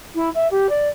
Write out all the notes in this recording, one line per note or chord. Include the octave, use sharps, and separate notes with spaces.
E4
E5
G4
D5